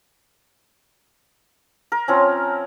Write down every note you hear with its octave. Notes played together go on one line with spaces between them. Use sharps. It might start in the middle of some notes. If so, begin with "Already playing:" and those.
A#4
F3 C4 C#4